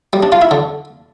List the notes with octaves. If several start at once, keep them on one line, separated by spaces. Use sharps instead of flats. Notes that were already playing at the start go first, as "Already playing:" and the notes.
G3
D4
F4
E4
D3